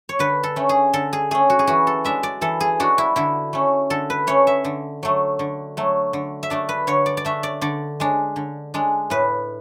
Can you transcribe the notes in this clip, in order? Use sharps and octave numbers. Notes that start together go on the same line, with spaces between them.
C#5
D3 B4
A4
A3 C#4
G#4
D3 A4
G#4
A3 C#4 G#4
F#4
G#4
E3 F#4
A4
G#3 D4 E5
D5
E3 A4
G#4
G#3 D4 F#4
E4
D3 E4
A3 C#4
D3 A4
B4
A3 C#4 C#5
E5
D3
F#3 A3
D3
F#3 A3
D3
E5
A3 D4 D5
B4
D3 C#5
D5
D5
A3 D4 E5
D5
D3 D5
G#3 D4
D3
G#3 D4
A2 B4